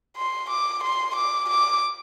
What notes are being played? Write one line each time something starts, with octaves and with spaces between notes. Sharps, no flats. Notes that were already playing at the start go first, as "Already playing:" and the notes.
C6
D6
C6
D6
D6